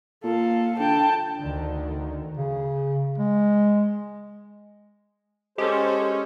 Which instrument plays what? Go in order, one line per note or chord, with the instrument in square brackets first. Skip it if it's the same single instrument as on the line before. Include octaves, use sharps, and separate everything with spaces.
[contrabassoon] A#2 [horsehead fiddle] A4 F5
[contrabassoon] D3 [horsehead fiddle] G5 A5
[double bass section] D2 D3 D#3
[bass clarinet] C#3
G#3
[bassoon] G#3 [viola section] C#4 [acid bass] G4 [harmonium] A4 C5